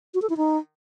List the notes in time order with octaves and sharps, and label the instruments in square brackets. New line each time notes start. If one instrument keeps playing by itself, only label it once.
[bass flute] F#4
A4
E4
D#4